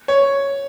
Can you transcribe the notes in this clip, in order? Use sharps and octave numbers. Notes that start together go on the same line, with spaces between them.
C#5